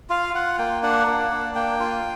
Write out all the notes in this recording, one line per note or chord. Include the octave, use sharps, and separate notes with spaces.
F4 F5
F4 F#5
A#3 G5
D4 F#5
A#3
D4
A#3 G5
F4